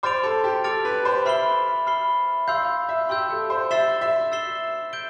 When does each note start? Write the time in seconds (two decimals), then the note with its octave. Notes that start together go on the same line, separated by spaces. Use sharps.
0.03 C5 D6 F6 A6 D7 F7
0.23 A4
0.44 G4
0.64 A4 D6 F6 A6 D7 F7
0.85 B4
1.05 C5
1.26 E5 B5 F6 C7 G7
1.87 B5 F6 C7 G7
2.48 F5 C6 E6 G6
2.89 E5
3.09 G4 C6 E6 G6
3.30 A4
3.50 C5
3.71 E5 E6 A6 C7 E7 G7
4.01 E5
4.32 E6 A6 C7 E7 G7
4.93 G6 D7 G7